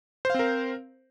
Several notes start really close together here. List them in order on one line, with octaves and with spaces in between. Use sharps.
C5 F5 C4 A#4